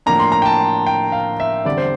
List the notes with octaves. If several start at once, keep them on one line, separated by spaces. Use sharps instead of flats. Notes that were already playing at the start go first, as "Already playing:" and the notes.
A2 F3 A#3 D4 A#5
C6
A#5
G5
A5
G5
F5
E5
E2 D3 G3 C4 D5
C5